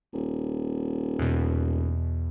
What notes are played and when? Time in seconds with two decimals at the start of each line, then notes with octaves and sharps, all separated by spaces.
0.13 D#1
1.19 E2 B2